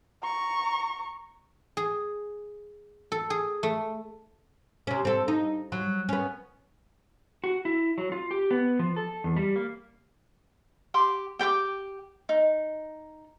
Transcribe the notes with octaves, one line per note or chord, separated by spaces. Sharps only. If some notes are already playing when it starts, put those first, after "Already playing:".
A#5 C#6
G#4
A4
G#4
A3
C3 C#4
C4 A4
D#4
F#3
B3 C#4
F#4
E4
F#3
F4
G4
B3
F3
A4
E2
G3
A#3
G4 C6 D6
G4 G5 B5 D6
D#4